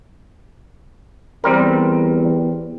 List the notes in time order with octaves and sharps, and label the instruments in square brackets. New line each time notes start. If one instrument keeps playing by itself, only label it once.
[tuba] E2 [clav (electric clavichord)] G3 C4 A#4